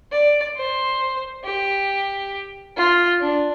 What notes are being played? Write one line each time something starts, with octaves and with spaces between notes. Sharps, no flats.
D5
C5
G4
F4
D4